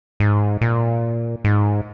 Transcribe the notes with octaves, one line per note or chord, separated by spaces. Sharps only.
G#2
A#2
G#2